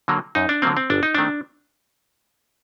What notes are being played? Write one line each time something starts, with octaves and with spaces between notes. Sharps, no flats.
D3 F#3 A#3
F#2 D#4
D4
D3 F#3 A#3 C4
C4
G1 D4
D#4
D#3 A3 C4 D4